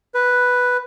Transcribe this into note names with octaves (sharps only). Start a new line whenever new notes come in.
B4